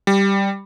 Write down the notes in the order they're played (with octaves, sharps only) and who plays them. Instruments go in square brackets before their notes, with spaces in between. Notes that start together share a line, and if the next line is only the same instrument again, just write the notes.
[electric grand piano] G3